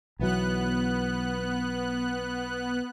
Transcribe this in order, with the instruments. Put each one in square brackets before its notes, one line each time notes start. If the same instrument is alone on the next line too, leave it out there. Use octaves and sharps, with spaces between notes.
[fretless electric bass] B1 E3 F#3 [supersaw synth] B3 F#6